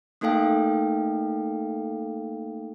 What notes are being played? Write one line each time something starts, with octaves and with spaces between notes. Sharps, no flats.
A3 A#3 D#4 A4 F5 G5